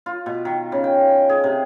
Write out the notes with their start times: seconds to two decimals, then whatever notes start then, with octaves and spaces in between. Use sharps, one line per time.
0.06 F4
0.26 B2
0.45 D#3
0.72 C#3
0.84 G5
1.29 G#4
1.44 C3